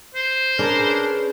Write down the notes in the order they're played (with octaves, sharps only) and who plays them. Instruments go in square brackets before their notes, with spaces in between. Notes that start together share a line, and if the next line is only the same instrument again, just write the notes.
[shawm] C5
[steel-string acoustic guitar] C#4 G#4 B4 [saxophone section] D4 A#4